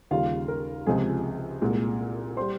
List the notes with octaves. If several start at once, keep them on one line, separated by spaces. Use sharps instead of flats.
D#2 C#3 G3 F4 F5
A#4
C#2 C3 F3 G#3 G#4 G#5
C2 A#2 G#3
G3 C5 C6